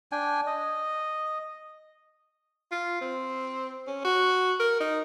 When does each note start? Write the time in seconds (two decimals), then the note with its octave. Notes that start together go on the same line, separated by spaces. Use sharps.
0.12 D4 G5 G#5
0.47 D#5
2.72 F4
3.01 C4
3.87 C#4
4.04 F#4
4.60 A#4
4.81 D#4